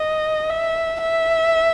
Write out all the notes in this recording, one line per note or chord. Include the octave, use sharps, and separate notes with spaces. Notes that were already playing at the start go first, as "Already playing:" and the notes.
Already playing: D#5
E5
E5